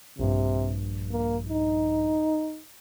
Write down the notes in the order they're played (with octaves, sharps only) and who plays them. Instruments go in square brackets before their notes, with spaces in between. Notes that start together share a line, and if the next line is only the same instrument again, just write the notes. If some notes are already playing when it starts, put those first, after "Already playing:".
[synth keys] A#1 G2 [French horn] C3
[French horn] A#3
D#4